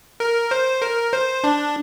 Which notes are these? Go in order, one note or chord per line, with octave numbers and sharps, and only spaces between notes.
A#4
C5
A#4
C5
D4